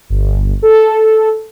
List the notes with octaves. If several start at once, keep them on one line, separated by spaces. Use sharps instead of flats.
G1
A4